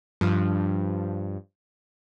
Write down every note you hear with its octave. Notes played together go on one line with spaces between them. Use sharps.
G2 F3